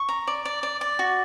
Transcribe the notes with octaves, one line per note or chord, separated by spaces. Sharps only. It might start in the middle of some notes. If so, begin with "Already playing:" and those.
Already playing: C#6
A#5
D5
D5
D5
D5
F#4